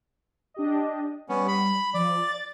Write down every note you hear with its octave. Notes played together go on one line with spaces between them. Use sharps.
D4 G4 D#5
G3 B3 C#4
B5
F3 D5
A6